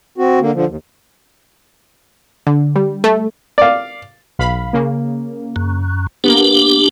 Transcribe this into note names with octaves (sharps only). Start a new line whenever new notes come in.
C4 F#4
D3 A#3
D3 F3
D#2
D3
G3
A3
D5 F5
B1 F5 B5
C#3 A#3
F#2
A#3 B3 D4 G4